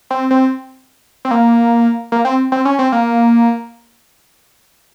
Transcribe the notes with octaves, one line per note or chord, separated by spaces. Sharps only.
C4
C4
C4
A#3
A#3
C4
C4
C#4
C4
A#3